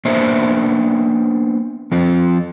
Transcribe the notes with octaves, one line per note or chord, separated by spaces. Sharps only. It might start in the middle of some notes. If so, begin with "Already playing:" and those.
A#3 B3 D4 C5 E5
F3 C4